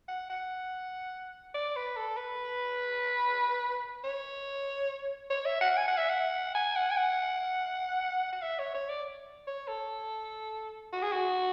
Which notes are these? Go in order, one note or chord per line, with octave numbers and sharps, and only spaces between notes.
F#5
F#5
D5
B4
A4
B4
C#5
C#5
E5
F#5
G#5
F#5
E5
F#5
G#5
F#5
G#5
F#5
F#5
E5
C#5
C#5
D5
C#5
A4
F#4
G#4
F#4